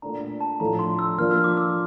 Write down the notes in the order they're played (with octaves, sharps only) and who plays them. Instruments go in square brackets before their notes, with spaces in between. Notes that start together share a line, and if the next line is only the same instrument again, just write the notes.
[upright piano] A#2 A3 D4 [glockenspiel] A#5
[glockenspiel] A5
[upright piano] A2 F3 A3 D4 A4 [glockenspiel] A#5
[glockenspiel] C6
E6
[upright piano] F3 A#3 D4 F4 [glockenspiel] F6
[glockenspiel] E6
D6
E6